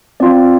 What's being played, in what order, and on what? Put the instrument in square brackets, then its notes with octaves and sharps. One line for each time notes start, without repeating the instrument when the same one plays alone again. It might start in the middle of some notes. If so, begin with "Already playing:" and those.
[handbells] C4 F4 D5